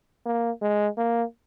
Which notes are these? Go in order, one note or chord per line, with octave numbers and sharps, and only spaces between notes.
A#3
G#3
A#3